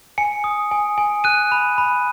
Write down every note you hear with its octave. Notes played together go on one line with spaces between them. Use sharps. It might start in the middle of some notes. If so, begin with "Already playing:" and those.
G#5 C#7
D#6
G#5
G#5
F#6 D#7
B5
B5